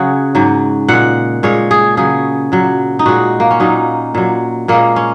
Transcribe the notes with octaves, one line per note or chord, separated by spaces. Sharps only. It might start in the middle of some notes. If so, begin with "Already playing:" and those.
Already playing: C#3 F#3 F#4 G#4
G#2 F#3
A#2 G#3 F#5
A#2 G#3 C#5
G#4
C#3 F#3 G#4
A#2 F#3
D#4
A#2 G#3 F#4
A#3
C#4
A#2 F#3 D#4
A#2 F#3
A#2 G#3 A#3
C#4